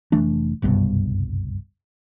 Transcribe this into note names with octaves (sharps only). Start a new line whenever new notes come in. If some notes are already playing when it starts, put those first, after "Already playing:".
F1 E3 A3 D4
F#1 C2 G2 B2